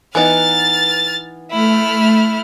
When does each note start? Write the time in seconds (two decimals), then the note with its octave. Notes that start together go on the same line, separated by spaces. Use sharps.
0.15 E3 B3 D#4 F6 A6
1.51 A3 E4 F6